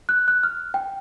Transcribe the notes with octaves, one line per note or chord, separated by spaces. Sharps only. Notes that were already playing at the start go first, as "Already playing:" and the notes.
F#6
F#6
F6
G5